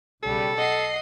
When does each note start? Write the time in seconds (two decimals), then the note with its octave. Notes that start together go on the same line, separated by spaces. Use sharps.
0.23 B1 C#3 G3 A4
0.58 D#5 F#5 C7